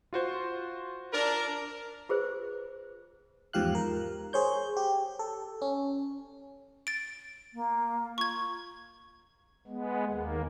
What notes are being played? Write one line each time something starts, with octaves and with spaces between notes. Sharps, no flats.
F4 F#4 C5
D4 A#4
F4 G#4 B4 C5
E2 G#2 F3 G4 F5 F#6
A#4
G#4 C5 C#5 G6
G4
A4
C#4
A6 D7
A#3
F4 C#6 G#6
G#3 B3
D#2 A#3